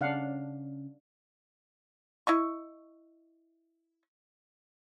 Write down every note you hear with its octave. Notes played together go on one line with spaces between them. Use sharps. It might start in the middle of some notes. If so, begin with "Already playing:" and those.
C#3 C#4 D4 F5 F#5
E4 D#5 C#6